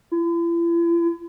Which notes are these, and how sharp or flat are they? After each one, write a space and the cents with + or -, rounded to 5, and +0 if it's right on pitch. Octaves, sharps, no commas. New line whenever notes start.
E4 +45